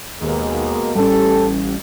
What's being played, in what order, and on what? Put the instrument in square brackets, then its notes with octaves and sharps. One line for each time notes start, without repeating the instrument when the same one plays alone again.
[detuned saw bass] D#2 [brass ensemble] B2 G#3 A#3
[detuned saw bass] A1 [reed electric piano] G3 C#4 [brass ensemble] G4 A4